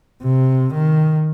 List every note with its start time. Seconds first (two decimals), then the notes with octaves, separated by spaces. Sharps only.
0.22 C3
0.74 D#3